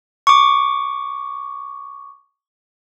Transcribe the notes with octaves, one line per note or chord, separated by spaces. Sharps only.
C#6 D6